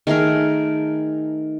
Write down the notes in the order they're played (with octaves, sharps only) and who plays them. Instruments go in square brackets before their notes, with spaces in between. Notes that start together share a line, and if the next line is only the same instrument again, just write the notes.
[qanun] D#3 A3 G#4 A#4